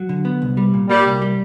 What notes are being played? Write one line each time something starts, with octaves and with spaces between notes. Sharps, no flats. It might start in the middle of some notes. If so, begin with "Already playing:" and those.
Already playing: F#3
D3
B3
C2
G3
A#2
G3 A#3
C2
G3